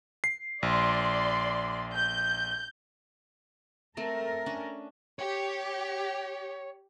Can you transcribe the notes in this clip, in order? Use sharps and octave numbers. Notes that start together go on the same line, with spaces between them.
C7
A#1 D5 C6
G6
A3 C4 A4 A#4
C#4 D4
G4 C#5